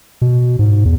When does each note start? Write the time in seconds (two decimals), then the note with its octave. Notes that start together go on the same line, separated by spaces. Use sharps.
0.22 B2
0.59 G#2
0.85 E2